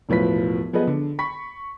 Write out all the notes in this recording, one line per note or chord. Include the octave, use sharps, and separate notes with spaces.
E1 A2 F3 B4 B6
F3 B3 G#4 B4 D#5
D3
B5 C#6 B6